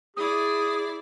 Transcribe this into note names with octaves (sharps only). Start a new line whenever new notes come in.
E4 G#4 D5 D#6